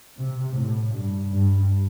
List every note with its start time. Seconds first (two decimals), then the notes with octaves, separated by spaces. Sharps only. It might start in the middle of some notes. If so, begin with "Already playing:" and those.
0.18 C3
0.55 A2
0.93 G2
1.32 G2